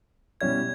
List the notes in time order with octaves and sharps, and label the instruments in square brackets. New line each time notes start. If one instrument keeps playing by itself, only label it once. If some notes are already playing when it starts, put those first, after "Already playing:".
[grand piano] B2 G3 C#4 E4 [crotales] G#6